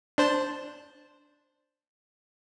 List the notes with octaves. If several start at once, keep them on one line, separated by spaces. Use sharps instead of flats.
D4 C5 A5